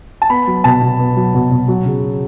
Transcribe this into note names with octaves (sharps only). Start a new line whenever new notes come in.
A5
B3 B5
F#3
B2 A5
B2
B3
F#3
B2
B2
F#3
C#3